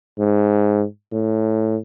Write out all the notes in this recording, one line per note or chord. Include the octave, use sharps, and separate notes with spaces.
G#2
A2